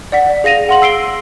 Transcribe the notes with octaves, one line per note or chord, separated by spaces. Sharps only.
D5 F#5 B6
G#4 F5 A#6 D#7 F7
F#5 C6 F#7
E6 C7 D7 G7